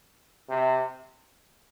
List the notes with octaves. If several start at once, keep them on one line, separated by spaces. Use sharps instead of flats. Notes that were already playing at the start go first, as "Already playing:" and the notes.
C3